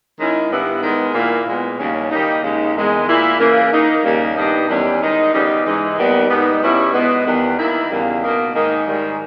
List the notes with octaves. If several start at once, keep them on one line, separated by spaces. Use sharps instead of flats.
D#3 G#3 C#4 E4
G2 G3 B3 E4
D#3 G#3 B3
A#2 A#3 E4
A#2 G#3 B3
D#2 C#3 G3 C#4
D#3 G3 A#3 D#4
D#2 C#3 G#3 D#4
E2 D#3 G#3
A#2 A#3 E4
C#3 E3 A#3
D#3 A#3 D#4
D#2 C#3 G3 A#3 D#4
G2 G3 B3 D#4
E2 D#3 G3 C#4 E4
D#3 G#3 D#4
C#3 G3 B3 D#4
G#2 E3 G#3 D#4
D#2 D#3 G3 B3
G#2 G3 B3 D#4
B2 G3 C#4 E4
B2 G#3 B3
E2 D#3 G3 B3
D#3 A#3 E4
E2 C#3 G3 A#3
B2 A#3 D#4
G#2 D#3 A#3 D#4
G#2 D#3 G3